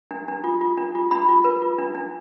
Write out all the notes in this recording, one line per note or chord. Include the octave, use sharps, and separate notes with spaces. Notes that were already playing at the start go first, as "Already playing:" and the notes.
D4
D4
F4
F4
D4
F4
D4 B5
F4
B4
F4
D4
D4